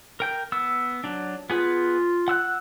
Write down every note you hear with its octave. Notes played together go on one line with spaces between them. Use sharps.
A#4 G5 G6
B3 E6
F#3 D4
B3 F4 G#4 B4
F#5 E6 F#6